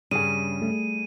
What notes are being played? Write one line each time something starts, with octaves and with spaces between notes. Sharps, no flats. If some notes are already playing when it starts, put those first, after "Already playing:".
G2 C#3 G3 G#4 D#7
A3